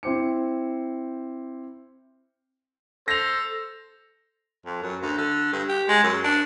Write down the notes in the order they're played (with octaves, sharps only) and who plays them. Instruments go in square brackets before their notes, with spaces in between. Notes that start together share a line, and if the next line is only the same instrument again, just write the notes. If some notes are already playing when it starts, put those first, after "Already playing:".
[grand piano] C4 E4 C5 D6 C#7
[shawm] A4 [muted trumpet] C5 [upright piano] A#6 F7
[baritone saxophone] F2
F#2
D2
D3
G2
G4
G#3
F#2
D4